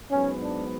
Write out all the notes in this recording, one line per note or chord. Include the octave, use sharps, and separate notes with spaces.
G#2 F#3 B3 C#4
D4